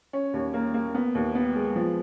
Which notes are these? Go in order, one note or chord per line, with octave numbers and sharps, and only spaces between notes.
C#4
D#2
A#3
A#3
B3
D#2
B3
G#3
F3